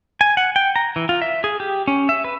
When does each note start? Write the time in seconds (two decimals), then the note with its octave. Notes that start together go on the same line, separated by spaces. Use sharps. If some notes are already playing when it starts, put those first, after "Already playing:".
0.21 G#5
0.37 F#5
0.56 G5
0.76 A#5
0.96 E3
1.09 F4
1.22 E5
1.44 G#4
1.60 G4
1.88 C#4
2.09 E5
2.25 B4